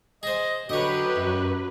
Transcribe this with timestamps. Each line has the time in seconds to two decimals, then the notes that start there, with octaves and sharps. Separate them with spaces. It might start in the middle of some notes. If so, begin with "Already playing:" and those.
0.23 G#4 C5 D#5
0.69 D3 F#3 G4 B4 C#5 D#5
1.16 F#2